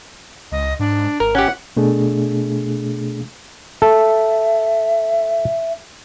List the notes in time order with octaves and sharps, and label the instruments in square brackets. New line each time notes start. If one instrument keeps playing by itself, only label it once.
[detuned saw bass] C#2 [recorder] D#5
[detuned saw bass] G#2 [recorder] D4
[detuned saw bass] G#1 [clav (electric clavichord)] A#4
[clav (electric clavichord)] C#4 G4 [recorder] F#5
[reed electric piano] B2 A3 D4 G#4
[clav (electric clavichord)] A4 [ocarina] E5